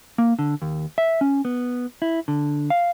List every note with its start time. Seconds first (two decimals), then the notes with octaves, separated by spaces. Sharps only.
0.18 A#3
0.39 D3
0.62 D#2
0.98 E5
1.21 C#4
1.45 B3
2.02 E4
2.28 D3
2.70 F5